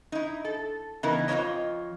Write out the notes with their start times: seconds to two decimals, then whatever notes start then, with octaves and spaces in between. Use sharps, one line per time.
0.12 D#4 E4
0.45 A4
1.03 C#3 E3 B3 D#4 E4 A#4
1.28 F2 F3 G#3 B4 C#5 D#5